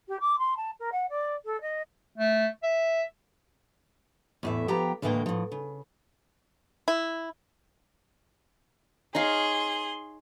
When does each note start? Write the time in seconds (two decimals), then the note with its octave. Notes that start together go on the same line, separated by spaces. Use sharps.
0.08 G4
0.20 D6
0.39 C6
0.57 A5
0.80 A#4
0.92 F#5
1.10 D5
1.45 A4
1.61 D#5
2.18 A3
2.63 E5
4.43 E2 A2 E5
4.68 F3 B3 G4 G5 A#5
5.02 D2 A2 E3 G#3 A#3 G5
5.26 A2 F3
5.52 C#3
6.88 E4
9.15 D#4 G#4 C#5 F5 C6